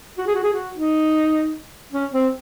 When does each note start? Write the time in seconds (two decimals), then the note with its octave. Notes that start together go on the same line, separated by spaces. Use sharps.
0.18 F#4
0.27 G#4
0.35 F#4
0.43 G#4
0.53 F#4
0.76 D#4
1.93 C#4
2.12 C4